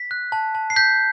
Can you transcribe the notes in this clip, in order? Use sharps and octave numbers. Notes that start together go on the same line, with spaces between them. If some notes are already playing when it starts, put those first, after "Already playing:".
Already playing: B6
F#6
A5
A5
C7
G6 B6